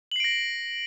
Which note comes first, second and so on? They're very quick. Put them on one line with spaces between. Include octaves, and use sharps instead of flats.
F#7 C7 D7 A#6